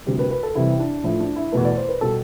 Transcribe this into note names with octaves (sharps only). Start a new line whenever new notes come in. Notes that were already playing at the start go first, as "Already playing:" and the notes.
D2 C3 G3 G4
B4
B4
A4
C2 C3 E3 G3 E4
D4
A2 F3 A3 E4
D4
E4
E2 B2 A3 B4
D5
C5
B4
B2 G3 A4